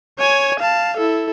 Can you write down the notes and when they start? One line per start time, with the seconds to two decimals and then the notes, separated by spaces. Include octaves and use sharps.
0.18 C#5 G#5
0.60 F5 A5
0.97 E4 A4